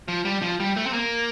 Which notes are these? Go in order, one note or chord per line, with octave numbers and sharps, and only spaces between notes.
F3
G3
F3
G3
A3
C4
A#3